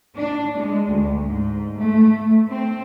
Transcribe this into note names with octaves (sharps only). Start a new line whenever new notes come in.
D4
G#3
D2
G#2
A3
C4